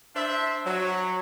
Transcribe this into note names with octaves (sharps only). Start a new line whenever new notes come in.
D4 C5 E5
F#3